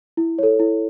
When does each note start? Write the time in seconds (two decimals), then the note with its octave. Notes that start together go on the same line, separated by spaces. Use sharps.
0.17 E4
0.39 A4 C#5
0.60 E4